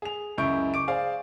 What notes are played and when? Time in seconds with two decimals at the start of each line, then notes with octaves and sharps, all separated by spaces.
0.02 G#4 F7
0.38 C#2 F#2 E4 C#6 G6 D7
0.74 C#6 D6 D7
0.88 G#4 C5 D5 F5